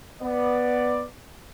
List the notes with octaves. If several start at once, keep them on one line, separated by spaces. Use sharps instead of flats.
B3 D5